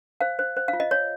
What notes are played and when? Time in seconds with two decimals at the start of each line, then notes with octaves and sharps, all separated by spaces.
0.21 C5 F5
0.39 C5
0.57 C5
0.68 F5
0.73 F4
0.80 D#5
0.91 C#5